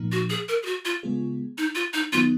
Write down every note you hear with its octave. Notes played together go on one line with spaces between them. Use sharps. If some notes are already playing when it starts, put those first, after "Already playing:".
Already playing: A#2 F3 A#3 D#4
F#4
G#4
A#4
G#4
F#4
F4
C#3 G#3 B3 F4 G#4
D#4
F4
D#4
D#3 F#3 B3 D#4 F4